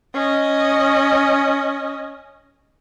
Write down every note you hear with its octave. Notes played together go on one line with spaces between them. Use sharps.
C#4 D#5